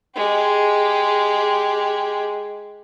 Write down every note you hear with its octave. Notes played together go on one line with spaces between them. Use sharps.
G#3 G4